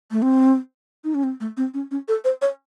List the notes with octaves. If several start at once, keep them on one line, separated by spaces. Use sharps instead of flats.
A3
C4
D#4
C#4
C4
A3
C4
C#4
C#4
A4
C5
C#5